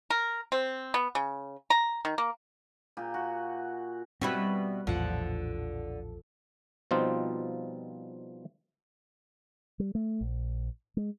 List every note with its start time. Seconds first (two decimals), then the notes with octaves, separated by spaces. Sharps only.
0.10 A#4
0.52 C4
0.94 B3
1.15 C#3
1.70 A#5
2.05 D#3
2.18 A#3
2.97 A#2 G4 G#5
3.14 F#4
4.22 B2 G3 C4 E4 F#4 B4 B5
4.87 A#1 E2 A2 D3 F3 F#5
6.91 B2 F3 G3 C4 D#4 F4
9.80 G3
9.95 A3
10.21 A#1
10.97 G#3